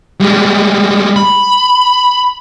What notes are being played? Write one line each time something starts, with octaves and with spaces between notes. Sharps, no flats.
G3 G#3
B5